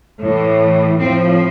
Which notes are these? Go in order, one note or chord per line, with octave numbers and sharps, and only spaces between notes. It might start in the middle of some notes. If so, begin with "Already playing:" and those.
A2 E3
A2 F3 C4